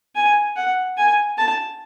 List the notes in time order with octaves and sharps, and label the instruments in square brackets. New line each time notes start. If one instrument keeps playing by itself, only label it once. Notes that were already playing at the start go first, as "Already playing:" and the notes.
[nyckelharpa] G#5
F#5
G#5
A5